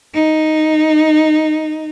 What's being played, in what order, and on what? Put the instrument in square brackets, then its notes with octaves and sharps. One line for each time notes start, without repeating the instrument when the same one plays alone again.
[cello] D#4